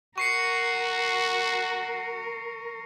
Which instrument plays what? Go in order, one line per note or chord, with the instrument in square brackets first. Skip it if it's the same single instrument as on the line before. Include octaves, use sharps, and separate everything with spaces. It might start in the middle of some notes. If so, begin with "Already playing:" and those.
[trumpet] F#4 [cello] A#4 [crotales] C#6 C7 C#7